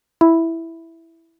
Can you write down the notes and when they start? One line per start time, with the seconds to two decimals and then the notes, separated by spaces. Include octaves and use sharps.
0.21 E4